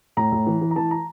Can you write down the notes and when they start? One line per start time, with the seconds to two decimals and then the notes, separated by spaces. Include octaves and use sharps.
0.17 A2 A#5
0.32 A2
0.47 E3
0.61 E3
0.71 A#5
0.76 E3 A5
0.91 A#5